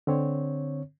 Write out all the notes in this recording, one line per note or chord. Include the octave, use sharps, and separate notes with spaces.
D3 C4 C#5